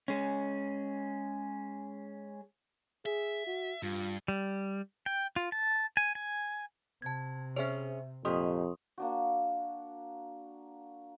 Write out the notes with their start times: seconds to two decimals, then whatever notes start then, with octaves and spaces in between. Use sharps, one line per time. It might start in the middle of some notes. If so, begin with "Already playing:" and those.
0.08 G#3 C#4
3.06 G#4 E5
3.46 F#4
3.83 G2 F4
4.28 G3
5.06 G5
5.36 F4
5.52 A5
5.97 G#5
6.15 G#5
7.02 C3 A5 G#6
7.56 C#4 G#4 C5 C#5 E5
8.25 F2 A#2 G4 D#5 C6 C#6 D#6
8.98 A#3 D4 F#4